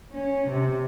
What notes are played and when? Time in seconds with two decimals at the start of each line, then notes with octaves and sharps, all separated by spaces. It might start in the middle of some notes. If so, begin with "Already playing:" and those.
0.12 C#4
0.48 C3